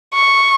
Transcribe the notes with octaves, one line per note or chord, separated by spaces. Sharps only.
C#6